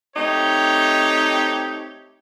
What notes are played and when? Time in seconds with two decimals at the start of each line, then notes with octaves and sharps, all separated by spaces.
0.16 A3 C4 D#4 G4 C#5